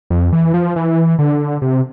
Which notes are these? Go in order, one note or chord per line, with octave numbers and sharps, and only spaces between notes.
F2
E3
F3
E3
D3
C3